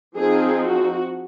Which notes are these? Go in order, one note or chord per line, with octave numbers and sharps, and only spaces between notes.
F3 C4 D#4 G#4
F#4